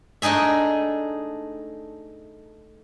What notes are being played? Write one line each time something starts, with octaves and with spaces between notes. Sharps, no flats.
A3 D4 D#4 G#4 E5